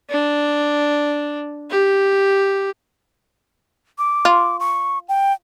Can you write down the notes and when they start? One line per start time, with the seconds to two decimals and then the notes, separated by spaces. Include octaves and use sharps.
0.10 D4
1.71 G4
3.98 D6
4.25 F4
4.60 C#6
5.09 G5